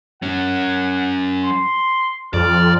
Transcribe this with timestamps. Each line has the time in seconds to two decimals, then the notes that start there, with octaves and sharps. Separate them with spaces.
0.22 F#3 C#4 F#5
1.44 C6
2.34 F2 D5 F6